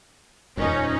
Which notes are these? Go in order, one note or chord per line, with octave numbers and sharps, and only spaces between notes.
D#1 F2 C#4 D#4